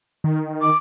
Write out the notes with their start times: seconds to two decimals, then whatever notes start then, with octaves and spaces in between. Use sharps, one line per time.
0.24 D#3
0.61 D6